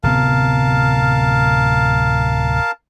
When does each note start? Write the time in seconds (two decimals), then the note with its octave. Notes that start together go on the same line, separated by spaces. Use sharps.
0.03 D1 C3 B3 A#4 F5 A5